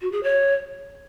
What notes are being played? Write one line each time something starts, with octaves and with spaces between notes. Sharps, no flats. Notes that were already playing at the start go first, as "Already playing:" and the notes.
F#4
G#4
C#5